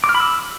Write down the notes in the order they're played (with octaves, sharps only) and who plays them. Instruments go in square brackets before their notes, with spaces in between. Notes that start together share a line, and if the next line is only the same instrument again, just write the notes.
[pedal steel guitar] D6
F6
B5
E6